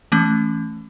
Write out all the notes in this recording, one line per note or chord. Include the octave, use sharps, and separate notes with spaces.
E3 A3 C#4